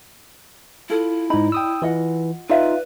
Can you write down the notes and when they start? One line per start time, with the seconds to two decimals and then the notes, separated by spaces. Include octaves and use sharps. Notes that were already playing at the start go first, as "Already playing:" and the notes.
0.90 E4 F4 A4
1.30 G#2 D#4 D5 D#5 B5
1.52 G5 D#6 E6
1.82 E3 F4 D#5 F#5
2.49 D#4 F4 B4 D5 E5 F5